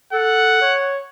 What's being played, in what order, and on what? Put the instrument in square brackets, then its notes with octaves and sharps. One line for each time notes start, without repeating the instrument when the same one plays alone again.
[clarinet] A4 [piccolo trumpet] F#5
[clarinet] C#5